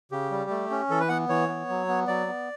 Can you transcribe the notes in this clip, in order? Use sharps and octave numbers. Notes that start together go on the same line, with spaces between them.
C#3 G4
G3
A3
C#4
E3 A4
B4
B3 F#5
E3 C#5
B3
F#3
B3
F#3 D5
B3